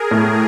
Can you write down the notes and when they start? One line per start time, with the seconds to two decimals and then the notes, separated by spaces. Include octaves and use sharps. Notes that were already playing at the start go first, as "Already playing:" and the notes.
Already playing: G#4 A#4
0.11 A2